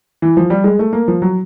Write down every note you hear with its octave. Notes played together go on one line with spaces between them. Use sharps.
E3
F3
G3
G#3
A3
A#3
F3
F#3